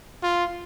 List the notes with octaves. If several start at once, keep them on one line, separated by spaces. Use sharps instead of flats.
F4